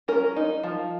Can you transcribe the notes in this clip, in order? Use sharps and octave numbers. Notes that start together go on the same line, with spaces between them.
C#4 A#4
D#4
F3